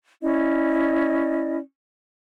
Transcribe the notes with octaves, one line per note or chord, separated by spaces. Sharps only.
C#4 E4 D5 D#5